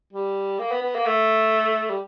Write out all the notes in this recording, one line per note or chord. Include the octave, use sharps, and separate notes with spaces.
G3
A#3
B3
B3
A#3
A3
G3